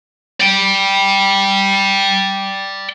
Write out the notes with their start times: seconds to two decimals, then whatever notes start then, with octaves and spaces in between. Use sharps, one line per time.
0.40 D5 G5